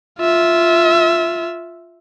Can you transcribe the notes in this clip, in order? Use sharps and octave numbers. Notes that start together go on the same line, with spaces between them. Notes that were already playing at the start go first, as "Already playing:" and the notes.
F4 E5